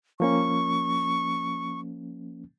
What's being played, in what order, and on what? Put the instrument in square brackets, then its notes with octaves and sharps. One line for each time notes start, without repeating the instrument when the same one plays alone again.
[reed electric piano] F3 A#3 C#4 [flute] C#6